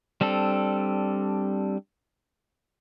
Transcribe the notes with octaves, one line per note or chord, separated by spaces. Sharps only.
G3 C4 D4 A4